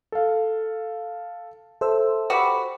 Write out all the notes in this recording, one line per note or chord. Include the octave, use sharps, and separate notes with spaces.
A4 F5
A4 C5 E5 E6
F#4 G4 B4